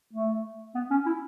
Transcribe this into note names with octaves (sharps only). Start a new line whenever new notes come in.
A3
B3
C#4
E4